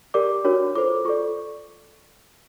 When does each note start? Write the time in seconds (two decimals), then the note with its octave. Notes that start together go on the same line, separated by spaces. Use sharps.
0.14 G4 A#4 D5 D6
0.44 D4 F#4 A#4 C#5
0.75 F4 A4 C5 D6
1.05 F4 A4 D5 C#6